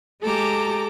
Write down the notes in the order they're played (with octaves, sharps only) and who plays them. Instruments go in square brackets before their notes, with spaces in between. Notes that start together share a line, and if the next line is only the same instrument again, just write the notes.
[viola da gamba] G#3 G4 [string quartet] A4 A#5 D6